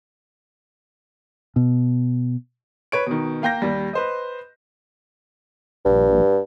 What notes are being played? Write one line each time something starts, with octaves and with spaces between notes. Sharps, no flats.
B2
B4 C#5 D7
B2 D#3
A#3 F5 G5 G6 A#6
D#2 G3
B4 C5 D#5
A#1 G2